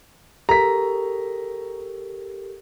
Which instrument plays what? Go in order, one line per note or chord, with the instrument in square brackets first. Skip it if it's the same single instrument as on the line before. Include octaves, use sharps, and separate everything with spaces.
[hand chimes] G4 A4 A#4 [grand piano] A#5 B6